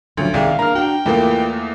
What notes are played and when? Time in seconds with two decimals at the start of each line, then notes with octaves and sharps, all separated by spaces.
0.17 D2 F3 F#3 C#4
0.34 C2 D#3 G#4 D5 F5
0.59 A#3 D4 A#5 F6
0.75 D4 F#4 G5
1.06 E2 A3 A#3 E4 F4 A4